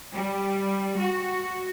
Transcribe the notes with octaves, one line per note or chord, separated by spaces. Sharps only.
G3
F#4